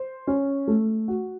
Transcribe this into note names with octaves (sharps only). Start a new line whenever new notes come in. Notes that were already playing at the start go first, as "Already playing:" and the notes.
Already playing: C5
C#4
A3
F#4